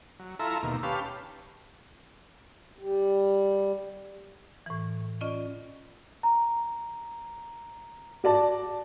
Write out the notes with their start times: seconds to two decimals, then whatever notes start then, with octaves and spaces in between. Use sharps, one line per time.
0.20 F#3
0.39 E4 F4 A4 E5 A#5
0.63 D#2 B2 A#3
0.83 C#4 G4 B4 F5 A5
2.78 G3
4.66 A2 E3
5.21 C#4 F4 D5 D#5
6.23 A#5
8.24 F#4 D5 A5